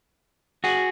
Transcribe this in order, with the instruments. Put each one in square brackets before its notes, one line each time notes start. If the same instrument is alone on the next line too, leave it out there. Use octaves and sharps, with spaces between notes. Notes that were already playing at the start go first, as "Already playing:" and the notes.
[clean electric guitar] F#4 G#4